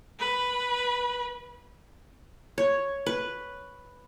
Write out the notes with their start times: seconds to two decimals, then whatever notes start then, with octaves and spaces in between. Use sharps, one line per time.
0.19 B4
2.58 C#5
3.06 B4